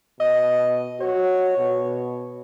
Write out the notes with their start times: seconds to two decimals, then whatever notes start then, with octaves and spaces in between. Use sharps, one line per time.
0.20 B2 D#5
1.01 F#4 C#5
1.58 B2